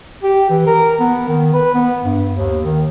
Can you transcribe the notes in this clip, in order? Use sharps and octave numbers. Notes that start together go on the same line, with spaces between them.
G4
E3
A#4
B3
D#3
B4
B3
G2
D#2
D#3